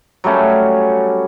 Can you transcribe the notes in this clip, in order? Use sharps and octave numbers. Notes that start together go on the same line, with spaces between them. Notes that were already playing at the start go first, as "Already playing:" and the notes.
F#3 G3 A3 C#4